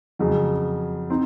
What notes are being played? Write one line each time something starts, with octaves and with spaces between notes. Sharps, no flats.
F2 C#3 F#3
C4 D#4